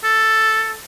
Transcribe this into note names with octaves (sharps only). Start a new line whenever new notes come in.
A4